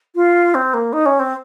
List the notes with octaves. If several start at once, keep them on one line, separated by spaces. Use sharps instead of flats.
F4
C4
A#3
D#4
C#4
C4